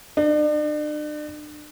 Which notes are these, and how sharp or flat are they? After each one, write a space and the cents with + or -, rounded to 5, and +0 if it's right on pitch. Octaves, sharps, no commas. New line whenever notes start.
D4 +40